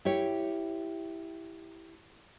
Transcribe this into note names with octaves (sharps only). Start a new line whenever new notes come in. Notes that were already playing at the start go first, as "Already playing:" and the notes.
E4 G4 C#5